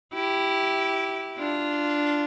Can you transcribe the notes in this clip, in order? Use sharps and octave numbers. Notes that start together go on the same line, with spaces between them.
E4 G4
D4 F4